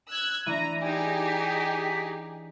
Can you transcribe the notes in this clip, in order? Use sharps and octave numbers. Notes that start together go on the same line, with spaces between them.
E6 F#6 G#6
E3 D4 A#5 D#7
D#4 G4 G#4 G#5
B6